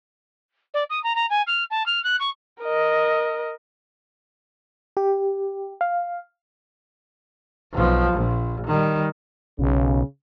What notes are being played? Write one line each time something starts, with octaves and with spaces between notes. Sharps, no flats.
D5
D#6
A#5
A#5
G#5
F6
A5
F6
F#6
C#6
A#4 D#5
G4
F5
B1 F3
A#1
D#3 G3
B1 C#3